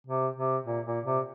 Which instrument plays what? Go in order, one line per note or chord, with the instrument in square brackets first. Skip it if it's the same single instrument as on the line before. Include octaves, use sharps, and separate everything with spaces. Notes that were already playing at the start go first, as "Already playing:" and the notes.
[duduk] C3
C3
A#2
A#2
C3